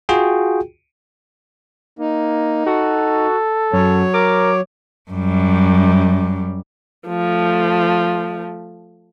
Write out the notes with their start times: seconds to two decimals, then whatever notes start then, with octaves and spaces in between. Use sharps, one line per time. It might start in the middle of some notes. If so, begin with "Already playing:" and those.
0.09 F4 F#4 G#4 G5
1.99 A#3 D#4
2.66 F#4 A4
3.73 F#2 F#3 C#5
4.14 A#4 D6
5.11 F#2 G3
7.08 F3 A3